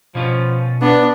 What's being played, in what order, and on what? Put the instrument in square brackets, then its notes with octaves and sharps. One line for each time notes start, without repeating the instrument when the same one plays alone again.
[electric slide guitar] B2 C#4 F4 [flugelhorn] F3
[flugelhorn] B3 [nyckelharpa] D4